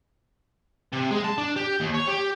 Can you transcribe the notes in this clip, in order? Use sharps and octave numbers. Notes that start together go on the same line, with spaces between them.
C3
G#3
A5
D4
G4
D#2
C#5
G4